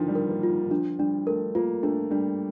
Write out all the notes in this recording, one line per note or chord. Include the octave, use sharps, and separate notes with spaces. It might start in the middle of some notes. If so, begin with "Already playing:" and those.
Already playing: D3 D#3 F3 D4
G3
A#4
A#3
F4
D#3
D#3
F3 D4
G3 D4
A3 A#4
A#3 F4
A3 D4
G3 D4